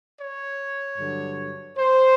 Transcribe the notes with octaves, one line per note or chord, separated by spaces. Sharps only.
C#5
G2 D3 F#3
C5